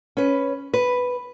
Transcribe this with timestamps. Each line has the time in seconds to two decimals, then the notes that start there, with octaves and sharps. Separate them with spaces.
0.17 C#4 B4
0.73 B4